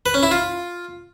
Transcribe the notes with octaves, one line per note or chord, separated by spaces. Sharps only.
B4
C#4
E4
F4